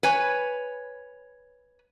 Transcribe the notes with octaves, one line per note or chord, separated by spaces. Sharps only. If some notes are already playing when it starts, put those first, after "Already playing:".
B4 C#5 G#5